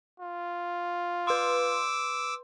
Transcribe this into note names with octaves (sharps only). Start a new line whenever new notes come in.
F4
B4 C6 D6 E6